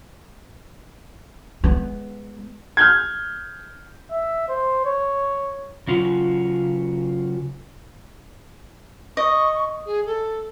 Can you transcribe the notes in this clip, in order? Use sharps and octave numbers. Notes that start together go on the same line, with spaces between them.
G#3 B3
F6 G6 G#6
E5
C5
C#5
C#3 F#3 C#4 F4 F#4
D#5 C#6
G#4
A4